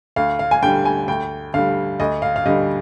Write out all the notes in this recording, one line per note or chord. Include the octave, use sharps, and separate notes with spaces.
D2 F5
F5
G#5
D3 G3 G5
G#5
D2 G5
D3 G3 F5
D2 D#5
F5
F5
D3 G3 D#5